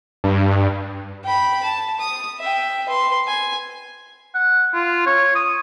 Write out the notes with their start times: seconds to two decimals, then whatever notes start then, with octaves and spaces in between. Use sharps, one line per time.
0.24 G2
1.24 G5 B5
1.64 A5
2.00 D#6
2.39 E5 G5
2.89 B4 C6
3.27 G#5
4.34 F#5
4.74 F4
5.06 C#5
5.35 D#6